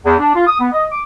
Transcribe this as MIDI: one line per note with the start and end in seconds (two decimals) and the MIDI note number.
0.05 0.13 40
0.18 0.31 62
0.35 0.43 65
0.47 0.57 87
0.60 0.67 59
0.72 0.84 75
0.92 1.01 86